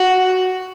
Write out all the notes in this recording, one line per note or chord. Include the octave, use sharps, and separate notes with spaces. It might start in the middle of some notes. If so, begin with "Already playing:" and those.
Already playing: F#4